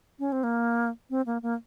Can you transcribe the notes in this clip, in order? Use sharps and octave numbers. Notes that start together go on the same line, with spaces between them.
C#4
C4
A#3
C4
A#3
A#3